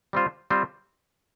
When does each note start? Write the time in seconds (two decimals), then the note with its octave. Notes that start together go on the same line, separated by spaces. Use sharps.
0.13 G3 C4 F4 C5
0.50 G3 C4 F4 C5